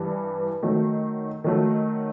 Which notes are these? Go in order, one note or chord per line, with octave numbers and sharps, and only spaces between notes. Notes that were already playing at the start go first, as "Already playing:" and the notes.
Already playing: G2 E3 G3
D#3 F#3 A3
D#3 F#3 A3